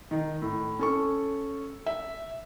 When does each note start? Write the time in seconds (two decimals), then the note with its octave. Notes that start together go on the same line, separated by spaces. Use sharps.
0.11 D#3 D#4
0.42 A2
0.79 C#4 A4 C#6
1.86 E5